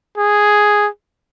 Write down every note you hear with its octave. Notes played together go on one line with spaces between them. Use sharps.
G#4